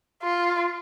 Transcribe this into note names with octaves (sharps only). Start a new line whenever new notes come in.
F4